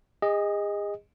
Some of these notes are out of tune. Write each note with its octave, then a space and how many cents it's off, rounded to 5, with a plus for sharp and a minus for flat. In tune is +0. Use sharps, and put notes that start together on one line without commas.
G#4 -35 D#5 +0